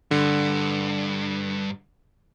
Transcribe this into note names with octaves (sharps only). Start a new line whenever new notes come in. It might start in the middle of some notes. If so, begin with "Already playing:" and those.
G2 D3